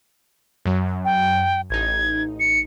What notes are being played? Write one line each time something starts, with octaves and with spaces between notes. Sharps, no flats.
F#2 F#3
G5
A1 D#4 G#6
C#7